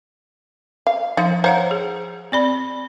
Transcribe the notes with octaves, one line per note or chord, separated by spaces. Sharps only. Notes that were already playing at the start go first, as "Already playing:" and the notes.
F5
F3 D#4 F5
C5 C#5 F5 F#5 A#5
G#4
C4 D5 B5